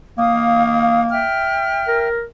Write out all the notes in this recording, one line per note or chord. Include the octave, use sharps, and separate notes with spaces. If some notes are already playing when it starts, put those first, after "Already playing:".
A#3 F5 D#6
E5 G5 F6
A#4